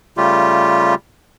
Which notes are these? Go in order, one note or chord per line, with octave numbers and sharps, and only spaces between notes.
C#3 G3 A3 F4 G4